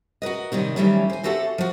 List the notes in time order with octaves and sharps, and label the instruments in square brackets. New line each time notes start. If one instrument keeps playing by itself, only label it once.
[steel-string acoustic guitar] F#4 A#4 B4 D#5
F#2 C3 D#3 G3 D#4
D#3 E3 F#3 G3 A3 C#4
C5 G#5
C4 F#4 G4 A4 E5 A5
F3 F#4